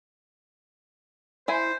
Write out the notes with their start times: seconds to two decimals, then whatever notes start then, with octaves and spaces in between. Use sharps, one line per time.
1.48 E4 C5 G#5